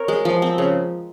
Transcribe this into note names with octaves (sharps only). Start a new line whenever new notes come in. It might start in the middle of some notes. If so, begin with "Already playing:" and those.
Already playing: C4 A#4 C#5
G#3
F3
C4
C#3